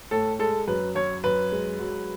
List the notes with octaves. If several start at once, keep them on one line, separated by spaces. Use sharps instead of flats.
A2 A4
G#3 A4
F#2 B4
F#2 C#5
F#2 B4
G#3
F#3